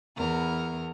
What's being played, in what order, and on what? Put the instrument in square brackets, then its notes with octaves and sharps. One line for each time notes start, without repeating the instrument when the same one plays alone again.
[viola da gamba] E2 A#4